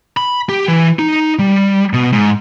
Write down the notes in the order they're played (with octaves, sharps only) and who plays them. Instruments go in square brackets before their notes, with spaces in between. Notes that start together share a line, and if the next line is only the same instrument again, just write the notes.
[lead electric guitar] B5
G4
E3
D#4
G3
B2
G#2